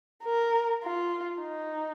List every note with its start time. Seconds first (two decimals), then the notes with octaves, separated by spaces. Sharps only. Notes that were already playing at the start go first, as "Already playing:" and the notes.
0.24 A#4
0.83 F4
1.41 D#4